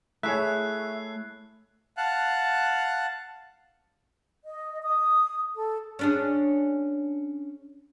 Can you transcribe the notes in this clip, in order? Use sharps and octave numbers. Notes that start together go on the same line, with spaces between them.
A3 E4 G#4 C#5 E5 F#6 C7
F5 F#5 A5 F#6
D#5
D#6
A4
C#4 D4 G#4